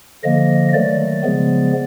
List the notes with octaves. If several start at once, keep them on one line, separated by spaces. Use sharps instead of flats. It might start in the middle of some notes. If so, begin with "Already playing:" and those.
D3 F3 A#3 D#5
D#3 F#3 A3 D5
C#3 F3 G#3 B3